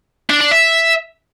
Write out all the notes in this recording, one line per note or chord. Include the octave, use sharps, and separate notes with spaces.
D4
D4
E5